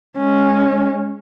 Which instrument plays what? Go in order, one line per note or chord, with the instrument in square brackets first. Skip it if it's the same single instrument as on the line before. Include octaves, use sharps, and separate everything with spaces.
[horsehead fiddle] G#3 C#4